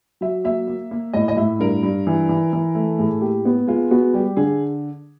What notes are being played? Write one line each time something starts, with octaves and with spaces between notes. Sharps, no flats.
F#3 E5
A#3 E5
A#3
A#3
A2 D#5
D#5
A2 E5
G2 A#4
G2
E3
E3
E3
A3
A2 G#4
A#3 G4
B3
G#3 F4
B3 F#4
G3 G4
D3 G#4